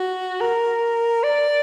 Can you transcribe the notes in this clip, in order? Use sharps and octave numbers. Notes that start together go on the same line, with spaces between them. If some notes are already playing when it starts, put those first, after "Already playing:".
Already playing: F#4
A#4
D5